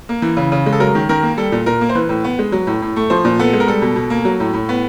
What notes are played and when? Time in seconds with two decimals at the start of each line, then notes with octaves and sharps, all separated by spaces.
0.09 A#3
0.22 E3
0.37 C#3
0.52 C#3
0.66 G#3
0.73 A4
0.80 F#3 A#4
0.95 D#3
1.09 D#3 A#4
1.23 A#3
1.37 G3 A4
1.52 A#2
1.66 A#2 A#4
1.81 A#3
1.89 C5
1.95 E3 B4
2.09 A2
2.24 B3
2.39 G#3
2.52 F#3
2.67 A2
2.82 A2
2.96 A3
3.10 F3 C5
3.25 A#2
3.39 B3 A4
3.53 G#3
3.60 A#4
3.67 G3 A4
3.82 B2
3.96 B2
4.10 A#3
4.25 F#3
4.40 A2
4.54 A2
4.69 B3